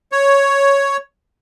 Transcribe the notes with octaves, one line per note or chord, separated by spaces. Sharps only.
C#5